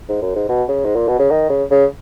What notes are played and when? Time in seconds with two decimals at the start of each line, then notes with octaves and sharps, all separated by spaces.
0.09 G#2
0.22 F#2
0.35 G#2
0.49 B2
0.69 C#3
0.85 G#2
0.95 A#2
1.08 B2
1.19 C#3
1.30 D#3
1.49 C#3
1.71 C#3